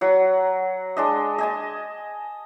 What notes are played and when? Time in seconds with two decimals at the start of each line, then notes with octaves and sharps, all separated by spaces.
0.01 F#3 F#5
0.97 G#3 D4 D#5
1.38 D#5 G#5 A5